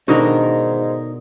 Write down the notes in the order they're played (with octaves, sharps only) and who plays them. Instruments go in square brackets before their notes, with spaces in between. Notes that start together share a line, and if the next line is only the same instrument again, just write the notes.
[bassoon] G#2 [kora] B2 D3 [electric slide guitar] D#4 A#4